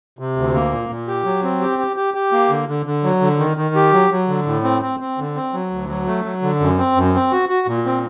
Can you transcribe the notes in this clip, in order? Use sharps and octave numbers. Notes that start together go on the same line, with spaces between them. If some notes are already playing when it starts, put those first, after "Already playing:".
C3
D2
A#3
A#2
A#2
G4
F#3
C4
G4
G4
G4
G4
A#3
D3
D3
D3
F#3
D3
D#3
D#3
G4
F#3
F#3
D3
A2
C4
C4
C4
D3
C4
F#3
D2
F#3
A3
F#3
D3
F#2
C4
F#2
C4
F#4
F#4
A#2
C4